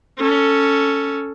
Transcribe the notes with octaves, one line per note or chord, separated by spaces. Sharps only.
C#4 A4